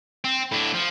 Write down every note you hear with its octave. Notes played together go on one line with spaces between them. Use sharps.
C4
A2 D4
F3